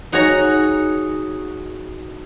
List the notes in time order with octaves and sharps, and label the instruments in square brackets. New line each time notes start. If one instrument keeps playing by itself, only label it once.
[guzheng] D#4 F#4 G#4 C#5 A#5